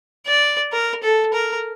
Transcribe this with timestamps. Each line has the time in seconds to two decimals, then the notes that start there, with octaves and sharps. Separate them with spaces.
0.27 D5
0.72 A#4
1.03 A4
1.33 A#4